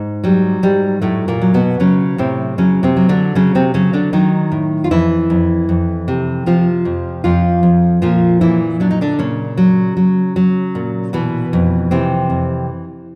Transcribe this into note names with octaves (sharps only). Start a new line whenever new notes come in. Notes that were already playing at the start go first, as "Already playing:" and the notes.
Already playing: G#2
F#3 G3
G#2 G3
A2 F#3 A3
A#2 A#3
F#3
B2 B3
C#3 F#3 C#4
A2 C3 C4
C#3 F#3 C#4
C3 C4
F#3
D3 D4
C#3 F#3 C#4
C3 C4
C#3 F#3 C#4
D3 D4
D#3 F#3 D#4
A2
F4
F2 E3 E4
F2
F2
C3
C3 F3 F4
F2
F2 F3 F4
F2
A#2 F3 F4
A#2 E3 E4
F#3 D4
D#4
D3 D4
A#2 C#3 C#4
F#3
F#3
F#3
A#2
B2 E3 B3
F2
C3 E3 C4
F2